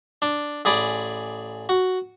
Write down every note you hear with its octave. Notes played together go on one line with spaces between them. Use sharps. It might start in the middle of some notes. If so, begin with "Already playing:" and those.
D4
A1 G#4 D5 B5
F#4